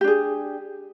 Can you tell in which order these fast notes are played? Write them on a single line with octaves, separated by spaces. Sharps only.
G4 D4 G#4